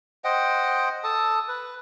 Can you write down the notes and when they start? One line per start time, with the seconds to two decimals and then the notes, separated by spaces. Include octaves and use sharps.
0.24 C5 D#5 F#5 G5
1.04 A4 A5 D#6
1.48 B4